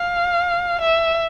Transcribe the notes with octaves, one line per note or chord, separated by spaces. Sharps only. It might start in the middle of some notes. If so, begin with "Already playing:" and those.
Already playing: F5
E5